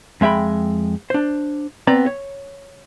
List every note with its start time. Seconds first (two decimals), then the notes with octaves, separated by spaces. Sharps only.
0.21 F2 G#3 E5 G5 B5
1.10 D4 C5
1.87 B3 C4 D5 A#5
2.06 C#5